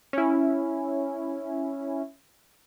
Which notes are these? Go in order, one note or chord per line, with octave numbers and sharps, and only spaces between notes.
C#4 E4